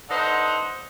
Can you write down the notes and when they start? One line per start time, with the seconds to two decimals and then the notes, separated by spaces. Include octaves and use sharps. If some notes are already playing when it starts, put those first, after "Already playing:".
0.10 D3 D#4 B4 C5